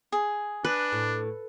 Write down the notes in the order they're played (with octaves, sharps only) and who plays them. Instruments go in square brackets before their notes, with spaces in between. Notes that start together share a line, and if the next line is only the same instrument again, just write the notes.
[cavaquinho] G#4
[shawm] D4 [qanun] B4
[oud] A2